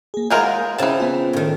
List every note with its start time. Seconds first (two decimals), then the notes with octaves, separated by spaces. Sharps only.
0.14 A#3 G#4
0.30 E3 G#3 F4 A#4 C#5 F#5 G6
0.78 C#3 E3 C4 A5
1.00 B3 F4
1.33 A2 D#3